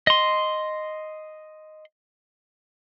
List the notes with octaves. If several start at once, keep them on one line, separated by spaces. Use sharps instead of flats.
D#5 C6